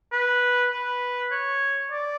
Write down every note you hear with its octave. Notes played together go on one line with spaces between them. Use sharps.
B4
B4
C#5
D5